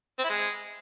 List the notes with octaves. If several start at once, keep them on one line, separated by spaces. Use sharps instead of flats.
C4
E4
G#3